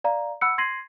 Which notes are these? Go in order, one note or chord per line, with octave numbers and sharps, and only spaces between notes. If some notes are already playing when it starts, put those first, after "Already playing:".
D5 F5 A#5
F#5 B5 E6 F#6 C#7
C6 G#6 A#6 C7 D#7 F#7